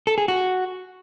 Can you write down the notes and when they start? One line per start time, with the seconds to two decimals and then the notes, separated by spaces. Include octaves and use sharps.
0.07 A4
0.18 G#4
0.28 F#4